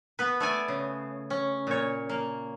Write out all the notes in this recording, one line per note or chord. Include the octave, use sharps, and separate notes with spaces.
B3 B4
A3 D5 G#5
C#3
C#4
A#2 C#5
A#3